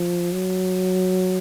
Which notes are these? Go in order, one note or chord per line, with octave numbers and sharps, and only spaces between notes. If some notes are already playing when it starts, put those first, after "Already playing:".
Already playing: F3
F#3